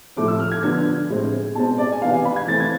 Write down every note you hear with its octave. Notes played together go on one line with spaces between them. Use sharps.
A2 F3 A3 C4 D6
E6
F6
G#6
D3 F3 B3 D4 G#6
A2 G#3 C4
B2 G#3 C4 A5
D5
G#5
C3 E3 B3 F5
G#5
B5
G#6
E3 A3 C4 A6
G#6